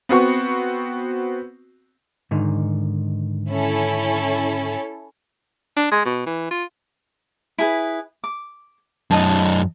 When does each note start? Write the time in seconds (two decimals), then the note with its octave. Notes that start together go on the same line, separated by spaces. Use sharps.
0.09 B3 C4 F#4 C#6
2.31 G#2 D3 D#3
3.50 C#4 E4 A4
5.77 D4
5.92 G#3
6.05 B2
6.26 E3
6.51 F4
7.58 E4 G#4 B4
8.24 D6
9.11 F#2 D#4 D#5 A5